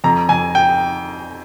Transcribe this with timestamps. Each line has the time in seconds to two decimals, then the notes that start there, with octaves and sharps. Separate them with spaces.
0.04 F2 A#5
0.29 F2 G#5
0.55 G5